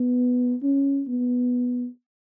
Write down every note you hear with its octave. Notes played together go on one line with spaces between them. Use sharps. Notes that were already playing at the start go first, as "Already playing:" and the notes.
Already playing: B3
C#4
B3